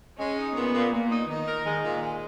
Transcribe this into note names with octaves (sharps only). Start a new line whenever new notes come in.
G#3 C#4
D#4
A#2 B3
A#2
A#2 A#3
D#4
D#3 D#4
A#4
D#3 G#3
A#2
G#3